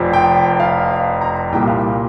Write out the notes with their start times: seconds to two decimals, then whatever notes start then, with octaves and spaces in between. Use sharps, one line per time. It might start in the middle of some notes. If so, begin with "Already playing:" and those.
Already playing: F1 F2 F3
0.13 G5
0.60 F5
1.21 A#5
1.52 C2 A#2 G3 G5
1.67 F5